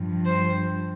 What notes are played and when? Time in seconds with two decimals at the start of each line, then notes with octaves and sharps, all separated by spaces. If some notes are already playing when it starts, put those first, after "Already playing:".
Already playing: G2 F3
0.26 C5